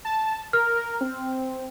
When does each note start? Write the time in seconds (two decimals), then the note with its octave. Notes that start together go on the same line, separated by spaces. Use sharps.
0.05 A5
0.53 A#4 F6
0.75 A#4
1.01 C4